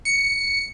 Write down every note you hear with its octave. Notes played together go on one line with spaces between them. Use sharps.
C#7